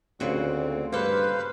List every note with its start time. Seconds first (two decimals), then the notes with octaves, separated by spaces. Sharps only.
0.20 D2 A#2 C#3 C4 F#4
0.92 G2 A#3 A4 B4 C5 F5